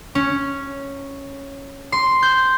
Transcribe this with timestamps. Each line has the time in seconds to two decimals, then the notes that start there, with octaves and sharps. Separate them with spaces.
0.15 C#4
1.92 C6
2.23 G6